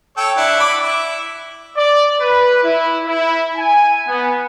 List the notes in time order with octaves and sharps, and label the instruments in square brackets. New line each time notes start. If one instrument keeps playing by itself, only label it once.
[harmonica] A4 C#5 G5
D4 E4 F#5
D5 B5
E4
[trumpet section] D5
B4
E4
E4
G#5
B3